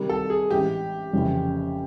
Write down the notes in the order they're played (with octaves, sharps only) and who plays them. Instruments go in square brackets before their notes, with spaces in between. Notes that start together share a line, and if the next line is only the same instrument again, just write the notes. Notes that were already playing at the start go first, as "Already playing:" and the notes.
Already playing: [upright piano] C3 D#3 G3
[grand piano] A4
G#4
[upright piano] A1 G#2 E3 [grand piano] G4
[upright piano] F1 F2 C#3 E3